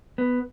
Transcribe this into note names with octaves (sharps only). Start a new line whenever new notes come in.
B3